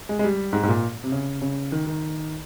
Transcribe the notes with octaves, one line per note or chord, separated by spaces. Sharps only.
G#3
G#3
G3
G#2
G#2
A#2
C3
C#3
C#3
D#3
D#3